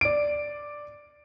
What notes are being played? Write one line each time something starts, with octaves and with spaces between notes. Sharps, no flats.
D5 D7